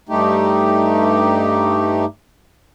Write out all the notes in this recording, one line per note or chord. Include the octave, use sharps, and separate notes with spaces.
G2 A3 D#4 G4